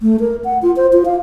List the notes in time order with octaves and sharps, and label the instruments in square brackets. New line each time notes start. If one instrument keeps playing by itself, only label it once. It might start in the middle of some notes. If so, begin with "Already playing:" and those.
[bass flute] A3
A#4
F#5
F4
C5
F4
F5